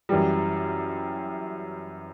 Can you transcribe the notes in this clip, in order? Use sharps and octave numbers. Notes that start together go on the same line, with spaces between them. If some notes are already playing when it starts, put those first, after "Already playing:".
F#2 E3 G3